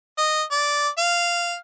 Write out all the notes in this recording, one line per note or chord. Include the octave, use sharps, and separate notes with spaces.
D#5
D5
F5